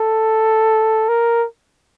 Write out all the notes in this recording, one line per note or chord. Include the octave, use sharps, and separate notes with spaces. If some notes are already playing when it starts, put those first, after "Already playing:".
Already playing: A4
A#4